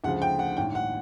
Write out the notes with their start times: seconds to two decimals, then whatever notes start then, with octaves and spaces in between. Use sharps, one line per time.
0.04 D2 C#3 F3 G#3 F#5
0.22 G5
0.39 F#5
0.57 A1 G2 D#3 G5
0.75 F#5